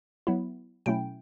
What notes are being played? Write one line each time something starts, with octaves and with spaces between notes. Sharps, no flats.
F#3 B3 E4
B2 F#3 A3 C#4 E4 G5